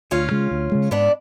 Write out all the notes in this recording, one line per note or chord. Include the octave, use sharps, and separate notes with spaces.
D2 C#4 F4
C#3 G#3
D2
C#3 G#3
G#2 B3 D4